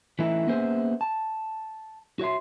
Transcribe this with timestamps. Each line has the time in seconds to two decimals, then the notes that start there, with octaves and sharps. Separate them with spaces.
0.19 E3 A3 C#4 D#4 E4
0.48 A#3 B3 C#4 G#4 C5 E5
1.01 A5
2.19 F#4 C#5 E5 C6